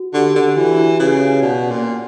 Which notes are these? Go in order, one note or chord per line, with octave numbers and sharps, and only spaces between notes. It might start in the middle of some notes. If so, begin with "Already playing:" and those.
Already playing: F#4
D3 G4
D3
G4
E3 F#4
E4
C#3 B4
C#5
B2 D5
A#2